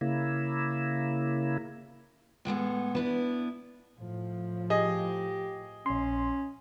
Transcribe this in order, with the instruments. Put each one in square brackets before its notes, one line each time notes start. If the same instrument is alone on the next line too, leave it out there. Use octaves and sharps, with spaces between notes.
[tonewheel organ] C#3 A#3 E4
[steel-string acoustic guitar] A2 G#3 A3 B3
B3 D4 E4
[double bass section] A2 F3
[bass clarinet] G4 [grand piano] G#4 D#5
[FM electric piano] A#1 C6 [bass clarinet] C#4